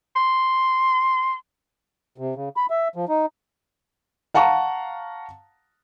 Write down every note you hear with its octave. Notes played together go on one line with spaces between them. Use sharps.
C6
C3
C#3
B5
E5
F3
D#4
F5 F#5 A5 A#5 C#6